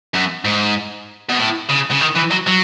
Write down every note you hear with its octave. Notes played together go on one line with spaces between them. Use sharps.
F#2
G#2
B2
A2
C#3
C#3
D#3
E3
F#3
F#3